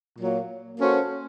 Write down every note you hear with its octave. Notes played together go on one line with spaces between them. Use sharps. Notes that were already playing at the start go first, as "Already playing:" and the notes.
A#2 F#3 A#3
A#3 C#4 F#4 A4 C5